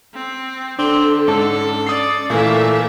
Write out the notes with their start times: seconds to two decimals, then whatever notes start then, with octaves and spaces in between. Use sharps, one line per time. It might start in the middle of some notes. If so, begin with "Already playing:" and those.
0.14 C4
0.79 D3 C4 D4
1.28 G#2 C#4 A4 A5
1.87 D5 D#6 C7
2.30 A#2 E3 A3 A#3 E5 G#5